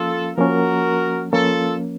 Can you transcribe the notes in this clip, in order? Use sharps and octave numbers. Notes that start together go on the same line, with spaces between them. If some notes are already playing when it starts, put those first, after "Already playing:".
Already playing: F3 A#3 C#4 F4 A4
F3 A#3 C#4 F#4 A#4
F3 A#3 C#4 F4 A4